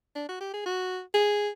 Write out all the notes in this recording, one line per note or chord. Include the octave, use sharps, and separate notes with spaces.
D4
F#4
G4
G#4
F#4
G#4